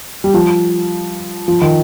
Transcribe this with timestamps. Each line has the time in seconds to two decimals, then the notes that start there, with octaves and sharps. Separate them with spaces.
0.24 G3
0.34 F3
1.48 F3
1.61 D#3